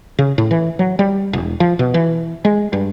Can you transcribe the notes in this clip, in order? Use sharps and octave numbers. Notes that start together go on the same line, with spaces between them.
C#3
A2
E3
F#3
G3
E1
F3
B2
E3
G#3
G2